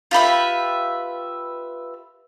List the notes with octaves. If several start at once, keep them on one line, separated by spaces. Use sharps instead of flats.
F4 G4 B4 E5